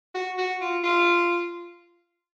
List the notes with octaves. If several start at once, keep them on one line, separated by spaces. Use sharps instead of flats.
F#4
F#4
F4
F4